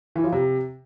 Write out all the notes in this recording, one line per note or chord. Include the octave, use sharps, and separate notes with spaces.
E3
F3
C3